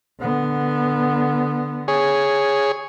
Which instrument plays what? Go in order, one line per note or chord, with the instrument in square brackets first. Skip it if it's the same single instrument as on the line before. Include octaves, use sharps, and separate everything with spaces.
[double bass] D3 B3
[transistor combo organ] G#4 C#5